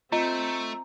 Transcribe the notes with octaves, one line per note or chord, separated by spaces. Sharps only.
A3 C4 F4 D#5 A#5